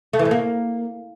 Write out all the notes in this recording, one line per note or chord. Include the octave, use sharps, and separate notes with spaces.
A3
E3
A2
A#3